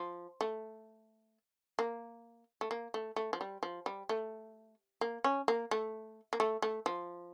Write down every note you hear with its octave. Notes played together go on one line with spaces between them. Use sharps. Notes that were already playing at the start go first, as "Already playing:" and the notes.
Already playing: F3
A3
A#3
A3
A#3
A3
A3
F3
G3
F3
G3
A3
A#3
C#4
A#3
A3
A#3
A3
A3
F3